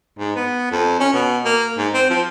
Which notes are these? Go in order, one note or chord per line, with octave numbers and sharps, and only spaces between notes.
G#2
B3
F2
C#4
B2
A#3
G#2
C4
F3